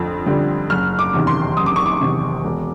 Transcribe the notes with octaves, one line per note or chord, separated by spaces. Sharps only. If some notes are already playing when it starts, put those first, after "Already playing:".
Already playing: F2 D3
D3 G3
F#1 F6
D6
E2 C3 D#3
C6
F#1 D#6
D6
C#6
D6
E2 C3 D#3
E1